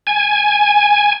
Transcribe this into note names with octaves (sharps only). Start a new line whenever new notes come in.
G#5